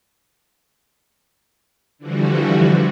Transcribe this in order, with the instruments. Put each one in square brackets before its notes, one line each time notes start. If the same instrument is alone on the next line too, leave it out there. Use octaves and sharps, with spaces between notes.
[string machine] D3 E3 F3 G3 F#4